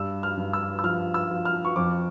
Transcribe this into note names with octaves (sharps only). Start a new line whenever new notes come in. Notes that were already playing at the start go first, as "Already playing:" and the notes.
Already playing: G2 E6
F6
G2
E6
E6
F3 F6
E6
F3
F6
C#6
F2 D6